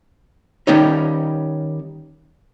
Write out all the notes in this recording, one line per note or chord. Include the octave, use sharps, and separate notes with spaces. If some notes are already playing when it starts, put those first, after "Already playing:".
D#3 G3 C#4 D#4